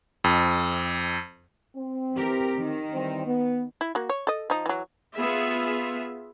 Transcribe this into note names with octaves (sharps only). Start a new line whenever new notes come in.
F2
C4
E3 G4 A#4
D#3
E3 G3 C4
B3
E4
A#3 F#4
C#5
A4 D#5
F3 D#4
E3 F#3
B3 F4 G#4 E5